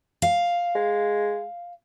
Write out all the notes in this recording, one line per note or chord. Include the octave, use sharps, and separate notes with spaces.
F5
G#3